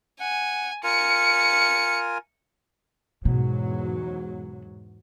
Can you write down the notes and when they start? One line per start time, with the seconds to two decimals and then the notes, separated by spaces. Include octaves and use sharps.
0.20 F#5 G#5
0.84 F4 A#4 G#5 C#7
3.25 E2 G#2 B2 F#3